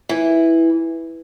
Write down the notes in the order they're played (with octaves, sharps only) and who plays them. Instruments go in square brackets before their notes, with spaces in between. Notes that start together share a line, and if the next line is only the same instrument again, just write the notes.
[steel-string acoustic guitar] E3